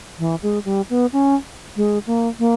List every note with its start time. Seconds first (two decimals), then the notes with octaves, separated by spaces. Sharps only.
0.19 E3
0.43 G#3
0.65 G3
0.90 B3
1.13 C#4
1.76 G#3
2.07 A#3
2.39 A#3